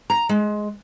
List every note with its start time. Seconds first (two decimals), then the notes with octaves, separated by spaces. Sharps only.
0.10 A#5
0.29 G#3